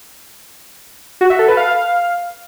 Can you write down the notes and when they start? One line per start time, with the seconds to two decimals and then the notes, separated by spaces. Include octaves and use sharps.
1.21 F#4
1.30 E5
1.39 A4
1.48 B4
1.57 F5